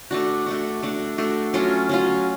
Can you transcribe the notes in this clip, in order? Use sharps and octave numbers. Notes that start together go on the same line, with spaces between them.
A3 D4 F#4
A3 D4 F#4
A3 D4 F#4
A3 D4 F#4
F#3 C#4 F4
F#3 C#4 F4